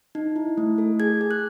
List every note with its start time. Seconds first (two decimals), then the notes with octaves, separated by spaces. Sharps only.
0.15 D#4
0.36 E4
0.57 A3
0.78 A4
1.00 G#4 G#6
1.21 G#4
1.31 F#6